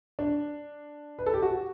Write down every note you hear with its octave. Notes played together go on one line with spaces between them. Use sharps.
D4
B4
A4
G4
F#4